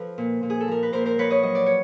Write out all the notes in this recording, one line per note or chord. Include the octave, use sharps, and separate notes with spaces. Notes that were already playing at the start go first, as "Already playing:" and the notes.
Already playing: F3 A4 B4
A#2
A#2
G#4
A4
F3 A#4
B4
A#2 A#4 C5
A#4 C5
F3 B4 C#5
C#5 D#5
F#3 D#5
D5
C#5